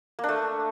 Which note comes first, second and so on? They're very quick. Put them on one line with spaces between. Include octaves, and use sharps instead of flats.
A#3 D4 A3